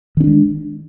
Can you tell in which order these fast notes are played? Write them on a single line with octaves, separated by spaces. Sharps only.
D#3 C#4 D4 G#3